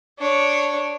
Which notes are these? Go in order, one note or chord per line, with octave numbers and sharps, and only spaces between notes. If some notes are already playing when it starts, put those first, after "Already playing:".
D4 C#5